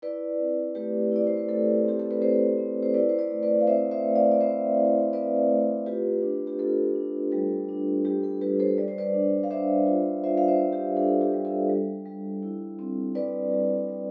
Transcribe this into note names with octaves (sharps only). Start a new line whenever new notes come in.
E4 B4 D5
C4
A3 G4 B4
E4 D5
C5
B4
A3 A4
C4 G4
A4
B4
C4 A4 C5
C4
C5
E4 B4 D5
C5
B4 D5
A3
B4 D5
F5
C4 C5 E5
C5 E5
A3
D5 F5
D5
C4 C5 E5
E4
C4 B4 D5
A3
F4 G4 B4
D4
G4
F4 A4
D4
G3 A4
D4
G3 G4
A4
G3 G4 B4
A4 C5
G3 D5
C5
B4 D5
D4
F5
D4 C5 E5
F4
F4 C5 E5
F5
C5 E5
G3
G4
D4 A4
G4
G3
A4
G3
G3
E4
C4
G3 B4 D5
G3
G3